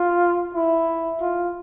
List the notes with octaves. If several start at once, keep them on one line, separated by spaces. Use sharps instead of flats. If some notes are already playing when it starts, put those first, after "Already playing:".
Already playing: F4
E4
F4